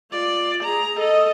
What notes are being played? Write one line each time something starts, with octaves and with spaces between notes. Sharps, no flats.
F4 D5
G#4 A#5
A4 D#5